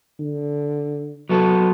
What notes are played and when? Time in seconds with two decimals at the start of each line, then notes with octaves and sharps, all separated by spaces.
0.19 D3
1.29 F#3 B3 A4